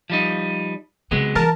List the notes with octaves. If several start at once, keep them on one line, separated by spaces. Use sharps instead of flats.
F3 G3 D#4
C#3 F#3 G#3 B3 C4
E3 A#4 A5